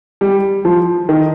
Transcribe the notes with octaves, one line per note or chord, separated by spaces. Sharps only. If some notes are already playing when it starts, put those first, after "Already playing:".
G3
F3
D#3